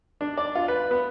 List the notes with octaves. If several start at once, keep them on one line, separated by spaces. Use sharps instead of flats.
D4
D5
F4
B4
B3